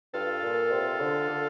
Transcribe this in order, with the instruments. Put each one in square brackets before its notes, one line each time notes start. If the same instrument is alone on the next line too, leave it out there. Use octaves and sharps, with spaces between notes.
[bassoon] G2 [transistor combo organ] F4 A4
[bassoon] A#2
C3
D3
D3